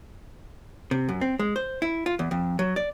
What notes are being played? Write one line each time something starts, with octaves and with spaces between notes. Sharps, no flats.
C3
F#2
C4
G#3
C5
E4
F4
E2
F2
F#3
D5